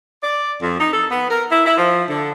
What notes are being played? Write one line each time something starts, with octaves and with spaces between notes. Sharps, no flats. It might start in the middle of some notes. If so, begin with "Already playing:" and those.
D5
F2
D#4
A4
B3
A#4
E4
E4
F3
D3